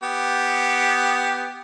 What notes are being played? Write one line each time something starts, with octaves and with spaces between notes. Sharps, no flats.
B3 G4